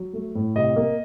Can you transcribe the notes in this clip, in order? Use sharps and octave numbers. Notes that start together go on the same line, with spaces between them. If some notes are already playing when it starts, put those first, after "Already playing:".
Already playing: F#3
A3
A2
C3 D#5
A#3